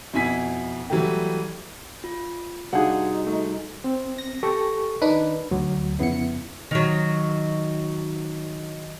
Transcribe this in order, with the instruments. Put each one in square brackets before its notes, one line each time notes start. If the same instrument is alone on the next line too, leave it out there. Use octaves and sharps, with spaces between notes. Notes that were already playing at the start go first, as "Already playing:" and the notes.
[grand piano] F2 B2 E4 G#5 B6
E3 F#3 G3 A3 G4
[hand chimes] F4
[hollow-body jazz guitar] C2 G#4 [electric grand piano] D4 F5 F#5 [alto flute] D#4 [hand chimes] F#4
[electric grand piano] A3
[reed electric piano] C4
[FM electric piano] A#6
[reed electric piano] G4 A4 C#6
[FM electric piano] D#3 D4 D#4 [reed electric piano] B4
[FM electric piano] D2 [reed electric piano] F#3
[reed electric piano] F2 B3 E4 [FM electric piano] C#3 C#7
[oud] D#3 F#3